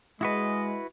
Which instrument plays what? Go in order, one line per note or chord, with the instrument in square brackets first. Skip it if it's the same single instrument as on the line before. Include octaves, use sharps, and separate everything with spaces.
[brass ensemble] G#3 [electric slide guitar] E4 F#4 B4 [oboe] D#5